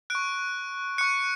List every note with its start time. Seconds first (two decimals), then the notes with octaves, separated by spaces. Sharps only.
0.10 C#6 F#6 D7
0.98 C#6 F#6 C#7